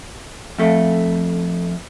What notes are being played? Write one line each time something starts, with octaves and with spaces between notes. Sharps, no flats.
F2 A3